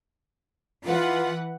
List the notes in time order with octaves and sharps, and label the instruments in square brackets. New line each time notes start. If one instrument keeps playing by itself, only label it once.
[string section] E3 B4 F#5 [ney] F4